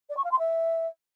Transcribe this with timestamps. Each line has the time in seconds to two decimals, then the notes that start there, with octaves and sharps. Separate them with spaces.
0.09 D5
0.17 C#6
0.24 F5
0.31 C6
0.39 E5